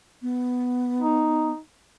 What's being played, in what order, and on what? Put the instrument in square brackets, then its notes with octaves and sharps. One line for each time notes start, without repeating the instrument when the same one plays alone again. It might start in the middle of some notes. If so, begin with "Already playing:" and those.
[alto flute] B3
[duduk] D#4